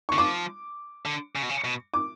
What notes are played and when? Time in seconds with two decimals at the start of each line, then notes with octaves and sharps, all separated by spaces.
0.09 C#6
0.12 D3
0.18 F3 D6
1.05 D3
1.35 C#3
1.42 B2
1.49 C#3
1.64 B2
1.94 D6